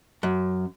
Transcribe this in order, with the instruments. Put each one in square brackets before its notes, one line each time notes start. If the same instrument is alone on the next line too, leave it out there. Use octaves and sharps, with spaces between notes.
[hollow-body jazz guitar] F#2